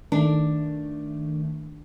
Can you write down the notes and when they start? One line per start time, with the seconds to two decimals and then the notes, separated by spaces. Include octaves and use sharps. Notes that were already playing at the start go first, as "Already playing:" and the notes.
0.12 D#3 A3 D4